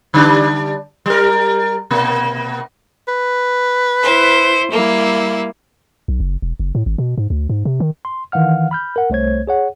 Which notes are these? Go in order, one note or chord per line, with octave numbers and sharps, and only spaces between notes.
D3 G3 D4
G3 A#4
B2 A#3
B4
E4 C5
G3 A#3 E4
B1
F#1
E1
F#1
A2
G#1
B2
G#2
D2
G#2
C3
D#3
C6
D#3 E3 F5 F#5 F6
B5 F6 G6
A#4 F#5
C2 A3 C5 C#5 G#6
G#4 C#5 F#5